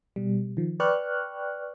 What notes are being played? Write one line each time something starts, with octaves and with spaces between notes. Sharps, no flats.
B2 G3
D#3 F3
B4 D5 G5 C#6 F6 F#6